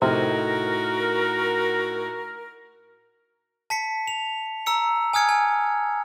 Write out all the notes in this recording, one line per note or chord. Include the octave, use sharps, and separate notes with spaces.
A2 C3 D#4 F#4 A#4
A5 B6 C#7
F7
A#5 E6 C#7
G#5 D#6 F6 G#6 C#7
G#5